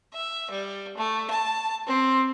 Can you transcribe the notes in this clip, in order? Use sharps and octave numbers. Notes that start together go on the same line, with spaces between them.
E5
G3
A3
A5
C4